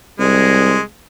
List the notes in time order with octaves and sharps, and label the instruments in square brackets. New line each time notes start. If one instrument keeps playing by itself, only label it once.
[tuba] C2 [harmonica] G#3